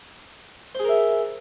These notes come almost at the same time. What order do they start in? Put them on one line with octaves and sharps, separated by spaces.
C5 G#4 A#4 E5